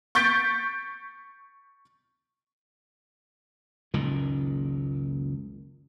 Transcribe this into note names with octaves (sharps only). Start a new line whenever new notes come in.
C#6 G6 A6 B6 D7
F#1 C#2 A#2 D#3